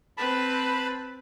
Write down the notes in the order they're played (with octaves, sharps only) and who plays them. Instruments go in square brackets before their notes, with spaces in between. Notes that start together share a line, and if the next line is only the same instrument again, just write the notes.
[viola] C4 B4 [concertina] A5 B5